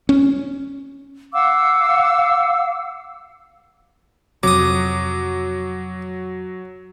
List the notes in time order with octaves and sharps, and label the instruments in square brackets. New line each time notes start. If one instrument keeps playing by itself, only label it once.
[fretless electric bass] C#4
[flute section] F5 F#5 D6 E6
[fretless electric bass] F2 C3 [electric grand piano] F#3 [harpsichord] D6 D#6